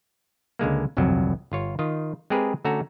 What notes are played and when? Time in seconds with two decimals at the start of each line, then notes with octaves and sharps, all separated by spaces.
0.59 C#2 D3 G#3 A#3
0.97 G1 C2 F2 F#3
1.52 G1 F4 C#5
1.79 D#3 F4 D#5
2.30 G#3 C4 G4 G#4 A#4 B4
2.64 D3 A3 C#4 F#4 A4 A#5